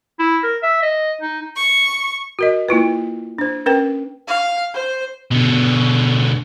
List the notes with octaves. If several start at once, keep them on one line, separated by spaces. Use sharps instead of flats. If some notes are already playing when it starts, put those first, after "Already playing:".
E4
A#4
E5
D#5
D#4
C#6
F#4 A#4 D#5
A#3 E4 F4 B4
D4 C5
C#4 A#4 B4 G5
F5
C5
B2 D3